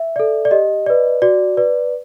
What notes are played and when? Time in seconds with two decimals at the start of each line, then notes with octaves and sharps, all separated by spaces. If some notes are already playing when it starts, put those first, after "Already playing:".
Already playing: E5
0.16 A4 D5
0.45 D5
0.51 G4 D#5
0.86 B4 D5
1.22 F#4 D5
1.57 B4 D5